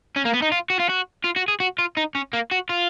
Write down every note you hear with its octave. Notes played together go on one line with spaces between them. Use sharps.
C#4
A#3
B3
D#4
F4
F#4
F4
F#4
F4
F#4
G#4
F#4
F4
D#4
C#4
A#3
F#4
F4